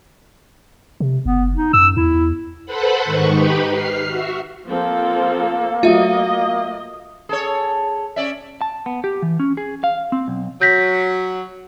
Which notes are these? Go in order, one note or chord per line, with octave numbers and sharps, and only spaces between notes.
C3
F#1 B3
D#4
F#2 E6
E2 E4
A4 B4 C5 F#5 B5
G#2 D#3 C#6
D#4 G4 B4 B5
F6 C7
F#4 E5
F3 A#3 C4 A4
F#3 A3 F4 D#5 E5
G#4 A4 C#5
C#4 D5 E5
A5
B3
G4
E3
C#4
G#4
F5
C4
B1
F#3 G6 A#6 B6